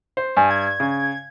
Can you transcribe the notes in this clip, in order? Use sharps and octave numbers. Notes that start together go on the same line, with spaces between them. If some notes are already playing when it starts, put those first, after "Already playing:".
C5
G2 G#5
G#6
C#3